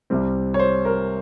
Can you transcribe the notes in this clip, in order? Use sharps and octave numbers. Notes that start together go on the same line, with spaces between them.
C2 C3 G3 C4
C#5
C5
A#4